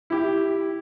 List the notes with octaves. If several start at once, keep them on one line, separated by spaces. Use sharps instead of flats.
E4 G4